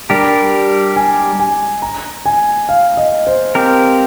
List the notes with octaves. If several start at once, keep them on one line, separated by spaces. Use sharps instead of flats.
G3 D4 G4 A#4 A#5
G#5
G#5
A#5
G#5
F5
D#5
C5
C4 G4 A#4